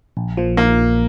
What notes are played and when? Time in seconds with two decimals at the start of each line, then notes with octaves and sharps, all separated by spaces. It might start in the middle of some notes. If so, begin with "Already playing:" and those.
0.17 A#1
0.37 A#2 F3
0.57 A#3